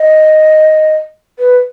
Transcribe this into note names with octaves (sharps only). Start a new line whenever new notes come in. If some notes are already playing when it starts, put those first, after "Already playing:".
Already playing: D#5
B4